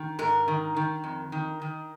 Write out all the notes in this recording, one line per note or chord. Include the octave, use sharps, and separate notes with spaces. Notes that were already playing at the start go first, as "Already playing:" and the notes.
Already playing: D#3
G#2 A#4
D#3
D#3
F2
D#3
D#3